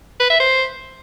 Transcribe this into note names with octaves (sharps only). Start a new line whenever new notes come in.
B4
E5
C5